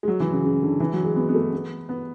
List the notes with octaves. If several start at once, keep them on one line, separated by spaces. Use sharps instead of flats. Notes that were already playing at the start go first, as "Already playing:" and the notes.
G#3
F#3
E3
C#3
C#3
D3
E3
F#3
G#3
B3
B3
A3
B3
B3